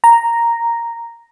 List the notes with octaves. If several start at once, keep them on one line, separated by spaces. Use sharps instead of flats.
A#5